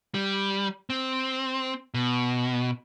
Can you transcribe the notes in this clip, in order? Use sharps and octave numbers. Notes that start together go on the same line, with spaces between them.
G3
C4
B2